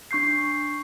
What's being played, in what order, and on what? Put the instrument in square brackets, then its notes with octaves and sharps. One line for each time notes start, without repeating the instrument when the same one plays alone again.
[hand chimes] D4 C#6 G6 C7